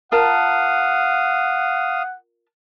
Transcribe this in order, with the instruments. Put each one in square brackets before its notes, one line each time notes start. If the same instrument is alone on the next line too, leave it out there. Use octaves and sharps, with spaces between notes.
[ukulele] F4 A#4 A5 [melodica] F5 D#6 [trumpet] F#5